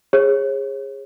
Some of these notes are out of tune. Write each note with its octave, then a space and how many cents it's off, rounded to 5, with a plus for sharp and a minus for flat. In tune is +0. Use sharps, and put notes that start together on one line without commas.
G#4 -20 C#5 -35